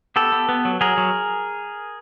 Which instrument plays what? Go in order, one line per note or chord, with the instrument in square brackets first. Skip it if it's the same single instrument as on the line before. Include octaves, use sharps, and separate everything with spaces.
[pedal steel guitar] B3 G4 A4
B3
B3
F#3
F#3 G#4 A#4
F#3